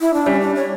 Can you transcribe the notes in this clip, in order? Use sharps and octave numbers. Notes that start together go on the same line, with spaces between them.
E4
D4
G3 C#4
D4
C#5